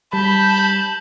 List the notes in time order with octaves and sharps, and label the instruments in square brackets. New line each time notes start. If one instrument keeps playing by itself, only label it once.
[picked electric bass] G3 [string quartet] A5 G6 [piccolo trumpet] B5